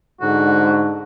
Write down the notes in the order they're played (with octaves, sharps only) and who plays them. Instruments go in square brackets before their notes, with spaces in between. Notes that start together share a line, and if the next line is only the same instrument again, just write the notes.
[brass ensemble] G#2 D3 [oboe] F#4